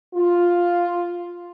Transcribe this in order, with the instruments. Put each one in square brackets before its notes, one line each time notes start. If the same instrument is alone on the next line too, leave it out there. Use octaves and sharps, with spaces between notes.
[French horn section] F4